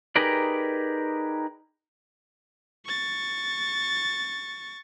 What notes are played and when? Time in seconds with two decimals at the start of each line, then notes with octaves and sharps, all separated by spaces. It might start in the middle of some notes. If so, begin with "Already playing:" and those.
0.16 D#4 G4 G#4 A#4 B4 D5
2.86 C#6 A6